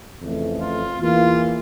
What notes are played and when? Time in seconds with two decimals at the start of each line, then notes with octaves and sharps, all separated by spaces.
0.22 F2 C#3 E3 A3
0.61 F4
1.00 E2 E3 A#3 F4